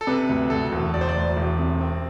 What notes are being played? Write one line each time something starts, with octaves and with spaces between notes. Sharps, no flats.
A4
C3 B4
D2
D2 A4
E1
E1 D5
C5
D5
D2
E1
C3
C4